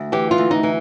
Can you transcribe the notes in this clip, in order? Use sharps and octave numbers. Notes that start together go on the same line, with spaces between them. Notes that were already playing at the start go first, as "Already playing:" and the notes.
Already playing: D2
E3 G4
F4
D2
D#4
E3